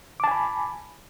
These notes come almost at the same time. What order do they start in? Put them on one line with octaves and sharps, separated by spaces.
D6 A5 G#5 B5